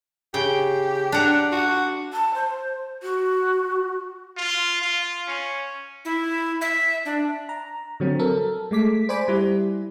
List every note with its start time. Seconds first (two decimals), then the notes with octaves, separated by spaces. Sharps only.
0.34 C#3 G4 G5
1.12 D4 F#5 A#5
1.52 F#4
2.13 A5
2.34 C5
3.03 F#4
4.37 F4
4.82 F4
5.28 C#4
6.05 E4
6.61 E5
7.05 D4
7.49 A#5
8.00 D3 F#3 C4
8.19 A4 A#4
8.71 G#3 A3 D6 B6
9.09 C5 D5 G#5 B5 D6
9.28 G3 E4